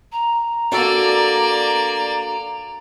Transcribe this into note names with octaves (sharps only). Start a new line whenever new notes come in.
A#5
A#3 D4 F#4 A4 D5